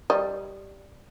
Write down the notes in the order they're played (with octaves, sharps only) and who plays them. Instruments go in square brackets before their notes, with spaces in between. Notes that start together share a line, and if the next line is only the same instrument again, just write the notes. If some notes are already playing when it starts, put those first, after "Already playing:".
[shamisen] G3 D#5